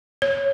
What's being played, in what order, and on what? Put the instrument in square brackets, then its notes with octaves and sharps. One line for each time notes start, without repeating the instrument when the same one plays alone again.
[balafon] C#5